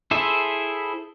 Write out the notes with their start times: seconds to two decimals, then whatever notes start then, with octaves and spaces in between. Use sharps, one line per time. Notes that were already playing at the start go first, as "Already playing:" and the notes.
0.11 E4 G#4 A4 C5 E5